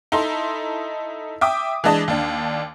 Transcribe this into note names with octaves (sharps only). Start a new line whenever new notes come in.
D#4 E4 A4 C6
E5 G5 D6 D#6
E3 G#3 D4 D#5 A5
D#2 D4